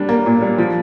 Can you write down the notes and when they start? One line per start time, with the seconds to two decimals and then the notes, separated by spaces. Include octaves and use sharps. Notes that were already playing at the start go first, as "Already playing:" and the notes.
Already playing: G3 D4
0.09 A#3
0.26 A#2
0.42 G3
0.58 F3